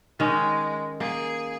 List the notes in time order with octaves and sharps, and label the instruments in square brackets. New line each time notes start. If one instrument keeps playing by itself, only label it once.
[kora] D#3 C#4 [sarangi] G#3
[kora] A#3 [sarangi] G#4